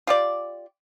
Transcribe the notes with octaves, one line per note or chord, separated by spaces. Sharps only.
F4 G4 D5